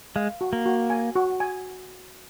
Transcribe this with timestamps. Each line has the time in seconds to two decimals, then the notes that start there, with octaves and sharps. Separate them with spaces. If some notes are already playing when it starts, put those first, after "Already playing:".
0.16 G#3 F5
0.41 F#4
0.53 A#3
0.66 F#4
0.90 G#5
1.15 F#4
1.40 G#5